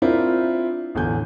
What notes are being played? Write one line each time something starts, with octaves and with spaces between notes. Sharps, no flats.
C4 D4 E4 F4 A#4 C5
A1 E2 D3 G#5 G6